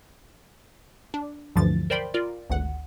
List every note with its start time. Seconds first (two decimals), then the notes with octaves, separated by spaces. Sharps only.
1.14 D4
1.56 D2 G2 D3 E3 F3 A6
1.90 A#4 C5 D5 G5 B5 C6
2.14 F4 A#4 D5
2.50 G#1 D2 F#5